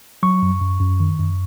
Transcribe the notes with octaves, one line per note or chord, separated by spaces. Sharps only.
F#3 C#6
F#2
F#2
F#2
D#3
F#2